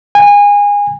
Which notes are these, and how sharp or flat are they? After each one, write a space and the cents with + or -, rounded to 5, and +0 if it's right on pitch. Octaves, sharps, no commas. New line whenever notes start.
G#5 -25